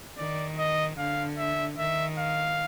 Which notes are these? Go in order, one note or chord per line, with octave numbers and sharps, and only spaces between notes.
D#3 D5
D#5
D3 F5
E5
D#3 E5
F5